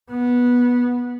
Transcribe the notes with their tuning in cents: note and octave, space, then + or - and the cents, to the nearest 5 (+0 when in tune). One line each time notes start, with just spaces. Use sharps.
B3 -15